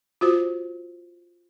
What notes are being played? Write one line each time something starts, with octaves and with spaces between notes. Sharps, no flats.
F4 F#4 C5